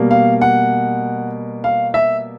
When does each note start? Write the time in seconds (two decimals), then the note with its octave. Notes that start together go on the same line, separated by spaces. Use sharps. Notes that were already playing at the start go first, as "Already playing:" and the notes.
Already playing: B2 G3 A#3
0.11 F5
0.41 F#5
1.64 F5
1.94 E5